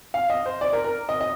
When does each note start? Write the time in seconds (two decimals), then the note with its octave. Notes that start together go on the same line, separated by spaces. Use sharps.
0.14 F5
0.30 D#5
0.46 C5
0.61 D5
0.73 A#4
0.84 A#4
1.09 D#5
1.21 D#5